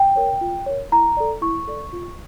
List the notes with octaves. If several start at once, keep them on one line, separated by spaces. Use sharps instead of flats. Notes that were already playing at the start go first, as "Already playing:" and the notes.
Already playing: G5
A#4 C#5
F4
A#4 C#5
E4 A#5
A4 D5
E4 C#6
A4 D5
F4